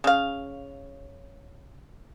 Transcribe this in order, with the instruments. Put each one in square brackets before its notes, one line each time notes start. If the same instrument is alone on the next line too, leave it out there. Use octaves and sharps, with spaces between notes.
[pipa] C#3 F5